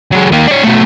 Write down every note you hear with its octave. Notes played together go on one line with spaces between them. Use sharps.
F#3 G#3
D#3 A#3
D4 C#5
B2 A3